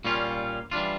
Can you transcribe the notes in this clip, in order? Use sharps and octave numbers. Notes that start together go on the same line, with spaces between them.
A#2 G3 C#4 F4
E3 G3 D4 F4